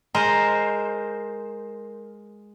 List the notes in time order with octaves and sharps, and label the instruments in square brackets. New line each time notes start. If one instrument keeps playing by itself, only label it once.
[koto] G#3 A#4 C5